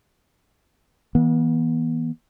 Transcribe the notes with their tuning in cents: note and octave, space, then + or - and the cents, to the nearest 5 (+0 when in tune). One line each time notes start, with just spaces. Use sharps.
E3 -25 B3 -40